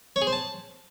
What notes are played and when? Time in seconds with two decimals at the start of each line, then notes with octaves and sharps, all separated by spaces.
0.16 C#5
0.22 G#4
0.27 C5
0.33 A5